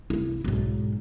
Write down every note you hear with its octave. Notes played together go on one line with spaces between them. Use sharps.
C2 E4
B1 G#2